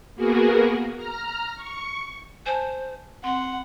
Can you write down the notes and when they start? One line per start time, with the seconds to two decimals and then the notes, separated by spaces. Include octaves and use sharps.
0.16 A#3 B3 F#4 G#4 A#4
0.96 A#5 F6
1.56 C#6 C#7
2.46 C5 G#5 A5
3.24 C4 F#5 C6